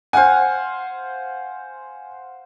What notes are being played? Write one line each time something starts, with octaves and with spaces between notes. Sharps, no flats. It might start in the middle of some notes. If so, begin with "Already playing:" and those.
C5 F5 F#5 G#5